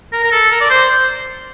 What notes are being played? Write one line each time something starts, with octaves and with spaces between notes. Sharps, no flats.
A#4
A#4
A4
A#4
D5
C5